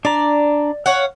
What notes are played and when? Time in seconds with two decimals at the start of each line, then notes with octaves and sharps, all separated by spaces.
0.05 D4 D5 A#5
0.86 C#5 F5 F#5